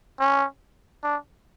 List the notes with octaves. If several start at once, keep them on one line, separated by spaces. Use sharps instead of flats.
C#4
D4